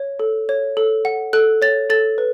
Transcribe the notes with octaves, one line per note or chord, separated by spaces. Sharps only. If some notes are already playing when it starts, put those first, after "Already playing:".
Already playing: C#5
A4
C#5
A4
F#5
A4 F#6
C#5 A6
A4 A6
B4